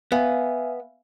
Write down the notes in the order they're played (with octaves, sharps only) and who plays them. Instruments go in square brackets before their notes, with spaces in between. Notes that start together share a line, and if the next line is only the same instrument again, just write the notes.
[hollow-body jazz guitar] B3 [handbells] E5 F5 G#5